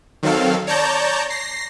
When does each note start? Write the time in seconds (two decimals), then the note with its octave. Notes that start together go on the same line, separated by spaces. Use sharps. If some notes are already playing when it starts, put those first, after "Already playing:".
0.23 D#3 F#3 C4 A4 F5
0.67 C#5 D5 A5 A#5 G6
1.30 A#6 C7